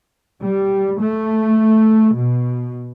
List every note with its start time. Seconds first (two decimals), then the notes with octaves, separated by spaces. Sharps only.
0.41 G3
1.01 A3
2.16 B2